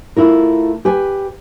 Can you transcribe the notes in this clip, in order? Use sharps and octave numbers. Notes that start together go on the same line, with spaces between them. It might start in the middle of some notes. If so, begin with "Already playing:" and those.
A3 E4 F4 A#4
G4 B4 G#5